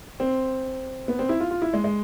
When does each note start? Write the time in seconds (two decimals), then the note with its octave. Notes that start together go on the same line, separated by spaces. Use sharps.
0.20 C4
1.08 B3
1.19 C4
1.29 E4
1.40 F4
1.51 F4
1.62 E4
1.74 G#3
1.84 G#3